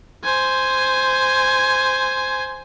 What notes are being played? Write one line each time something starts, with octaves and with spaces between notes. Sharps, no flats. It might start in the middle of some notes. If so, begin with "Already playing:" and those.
C5 G#5